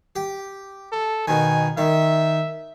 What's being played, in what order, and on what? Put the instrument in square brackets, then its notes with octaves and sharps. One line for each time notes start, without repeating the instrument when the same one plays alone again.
[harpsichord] G4
[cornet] A4
[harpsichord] B2 D#3 [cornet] G#5
[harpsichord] D#3 [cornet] E5